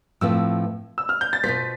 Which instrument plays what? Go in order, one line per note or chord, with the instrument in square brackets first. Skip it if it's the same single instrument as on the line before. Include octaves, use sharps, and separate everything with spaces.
[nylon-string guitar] A2 F3 C4 F4 B4 [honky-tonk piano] E6
[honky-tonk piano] E6
F6
G6
A6
[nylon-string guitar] B2 B3 F4 C5 [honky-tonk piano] B6